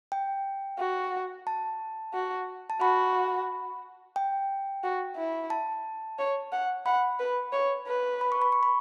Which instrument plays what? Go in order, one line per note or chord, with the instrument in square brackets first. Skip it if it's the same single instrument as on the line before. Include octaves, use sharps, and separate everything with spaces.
[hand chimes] G5
[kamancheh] F#4
[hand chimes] A5
[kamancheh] F#4
[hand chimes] A5
[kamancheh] F#4 [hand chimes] B5
[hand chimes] G5
[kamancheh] F#4
E4
[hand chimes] A5
[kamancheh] C#5
F#5
[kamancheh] F#5 [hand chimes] B5
[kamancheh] B4
C#5
B4
[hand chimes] B5
C#6
B5
C#6
B5